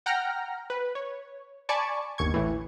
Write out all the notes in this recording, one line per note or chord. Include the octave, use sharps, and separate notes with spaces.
F#5 G5 A#5 F6 A#6
B4
C#5
D5 G#5 A5 B5 C#6 D6
G1 D#2 C#6 G#6
A1 A2 E3